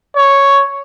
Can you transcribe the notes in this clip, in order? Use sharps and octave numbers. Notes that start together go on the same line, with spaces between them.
C#5